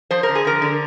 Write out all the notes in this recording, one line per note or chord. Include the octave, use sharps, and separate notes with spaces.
F3 C5
A#4
D3
G#4
D3 A#4
D3